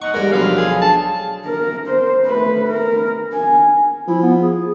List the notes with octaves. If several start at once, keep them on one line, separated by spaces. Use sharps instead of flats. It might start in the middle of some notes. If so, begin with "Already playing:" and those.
D#4 F#5 C#6
G#2 G3 A#4
B1 D3 F3 B4 F5 F6
G#4
A5
A#4
C5
A3 B4
A#4
G#5
F3 E4
B3
G#4